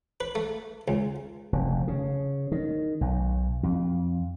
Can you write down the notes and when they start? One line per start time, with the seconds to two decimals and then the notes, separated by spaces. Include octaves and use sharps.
0.20 B4
0.35 A3
0.88 C#2
1.53 F1
1.88 C#3
2.52 D#3
3.01 B1
3.63 F2